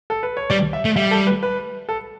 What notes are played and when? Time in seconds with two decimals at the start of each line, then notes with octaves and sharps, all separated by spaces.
0.10 A4
0.23 B4
0.37 C#5
0.50 G3 D5
0.73 E5
0.85 A3
0.96 G3 E5
1.11 A4
1.27 B4
1.43 B4
1.89 A4